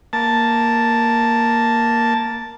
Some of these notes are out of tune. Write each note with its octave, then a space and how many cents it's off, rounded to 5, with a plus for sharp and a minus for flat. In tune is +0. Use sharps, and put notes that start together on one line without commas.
A#3 +0 A5 +0